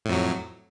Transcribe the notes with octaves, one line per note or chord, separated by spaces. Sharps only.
F2 A2 F#3